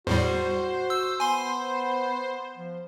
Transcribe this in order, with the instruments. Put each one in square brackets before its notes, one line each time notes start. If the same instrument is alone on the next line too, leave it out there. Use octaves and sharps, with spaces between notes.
[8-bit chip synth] E2 A2 G3 [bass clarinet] F#4 [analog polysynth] C5
[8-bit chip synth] E6
[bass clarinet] B3 [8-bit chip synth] G#5 C6
[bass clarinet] F3